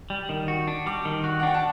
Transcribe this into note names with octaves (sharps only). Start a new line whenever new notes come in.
G3
D#3
F#4
D4
G3 D6
D#3
F#4
F#5
D4 G5
A5